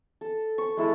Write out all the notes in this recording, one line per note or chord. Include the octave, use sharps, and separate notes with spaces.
A4
C#6
G#3 E4 A4